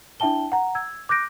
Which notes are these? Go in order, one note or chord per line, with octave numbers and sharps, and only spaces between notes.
D4 E4 E5 G5 A5 G7
F#5 A#5
E6 G#6
D6 F#6 G6 A#6 D7